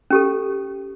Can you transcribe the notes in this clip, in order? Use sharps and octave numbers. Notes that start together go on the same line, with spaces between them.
C#4 G4 A4